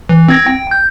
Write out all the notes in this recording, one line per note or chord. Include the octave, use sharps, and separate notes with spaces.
E3
C4 G#6 A#6
G5
G6